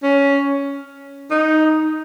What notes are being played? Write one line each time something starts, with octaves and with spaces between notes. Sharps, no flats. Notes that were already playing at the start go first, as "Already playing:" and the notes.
C#4
D#4